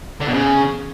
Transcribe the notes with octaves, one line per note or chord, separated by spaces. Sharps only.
D3
B2
C#3